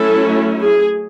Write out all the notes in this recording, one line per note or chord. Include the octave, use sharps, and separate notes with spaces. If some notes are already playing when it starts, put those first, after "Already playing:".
Already playing: F#3 A3 C#4 E4 A4
G#4